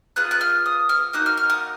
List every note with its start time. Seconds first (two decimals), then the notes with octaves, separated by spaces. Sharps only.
0.16 B3 F4 G#4 F#6
0.31 F#6
0.41 F6
0.66 D#6
0.89 F6
1.13 A#3 D#4 F#4 F#6
1.26 F6
1.37 F6
1.50 D#6